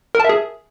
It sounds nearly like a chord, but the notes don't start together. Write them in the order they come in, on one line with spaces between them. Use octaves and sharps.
A#4 A5 E5 G#4